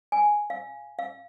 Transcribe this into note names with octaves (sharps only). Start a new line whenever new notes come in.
G#5
F5
F5